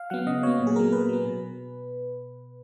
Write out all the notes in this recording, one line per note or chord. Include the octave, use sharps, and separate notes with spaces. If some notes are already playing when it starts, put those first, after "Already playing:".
Already playing: F5
F#3 B3 F#5
C#3 D#5
F#3 B3 C#5
A#2
G#4
F#3 B3 A#4
A#2 B4
F#3 B3
B2